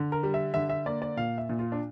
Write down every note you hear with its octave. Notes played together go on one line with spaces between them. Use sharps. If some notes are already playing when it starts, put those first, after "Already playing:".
Already playing: D3
A#4
G3
E5
D3 E5
E5
A#3 D5
D5
A#2 F5
E5
A#2
F4
D4